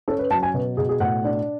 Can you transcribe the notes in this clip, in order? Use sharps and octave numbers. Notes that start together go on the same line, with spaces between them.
C#4 A4
B4
F#3 A5
G#5
B2 B4
B2 G#4
G#4
A2 F#5
D4